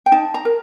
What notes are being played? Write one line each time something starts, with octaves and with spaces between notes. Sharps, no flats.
G5
D#4 A5
A#5
A#4